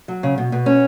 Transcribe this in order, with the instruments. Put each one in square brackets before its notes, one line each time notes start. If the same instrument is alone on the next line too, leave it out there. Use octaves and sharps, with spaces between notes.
[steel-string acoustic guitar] F#3
C#3
B2
B2
C#4